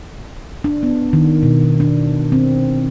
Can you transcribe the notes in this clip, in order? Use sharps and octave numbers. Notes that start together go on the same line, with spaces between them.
D4
B3
D#3
B2
D4
C4